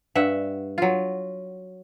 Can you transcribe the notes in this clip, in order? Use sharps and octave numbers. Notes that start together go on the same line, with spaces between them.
G2 E5 F#5
F#3 F4